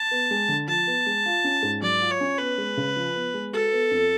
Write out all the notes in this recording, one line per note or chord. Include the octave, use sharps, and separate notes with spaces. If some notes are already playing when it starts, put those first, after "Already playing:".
Already playing: A5
B3
G#3
D3
F3 A5
B3
G#3
F4
C#4
G#2
F#3 D5
F4
C#5
C#4
B3 B4
G#3
C#3
F3
B3
G#3
F#4 A4
B3
F2